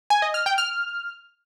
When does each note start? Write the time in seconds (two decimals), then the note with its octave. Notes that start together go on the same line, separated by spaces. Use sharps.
0.10 G#5
0.22 D#5
0.34 F6
0.46 G5
0.58 F6